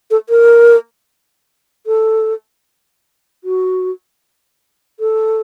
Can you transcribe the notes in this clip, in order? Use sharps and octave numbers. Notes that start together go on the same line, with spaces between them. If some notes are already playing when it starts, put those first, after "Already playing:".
A4
A#4
A4
F#4
A4